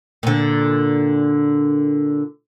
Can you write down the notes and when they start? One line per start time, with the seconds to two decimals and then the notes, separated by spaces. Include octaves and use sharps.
0.23 A#2 D3